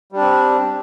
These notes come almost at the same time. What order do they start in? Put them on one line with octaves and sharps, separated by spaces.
G3 D4 C4